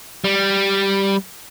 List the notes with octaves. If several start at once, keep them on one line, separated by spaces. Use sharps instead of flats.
G3